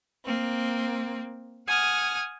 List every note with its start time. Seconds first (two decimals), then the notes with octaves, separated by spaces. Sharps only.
0.24 A#3 C4
1.67 F#5 G#5 D#6 F6